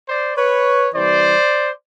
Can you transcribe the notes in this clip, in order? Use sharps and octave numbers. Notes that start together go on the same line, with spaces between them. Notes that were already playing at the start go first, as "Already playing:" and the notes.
C5 D5
B4 C#5
C3 E3 G3 C5 D5